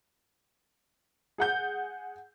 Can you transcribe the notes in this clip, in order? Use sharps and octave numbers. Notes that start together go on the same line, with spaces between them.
G#4 F#5 G6